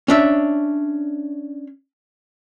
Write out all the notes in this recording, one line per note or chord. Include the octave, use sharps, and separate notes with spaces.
C#4 D4 E5